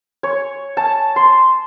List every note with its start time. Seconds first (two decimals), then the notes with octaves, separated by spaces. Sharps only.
0.23 C#5
0.77 A5
1.16 C6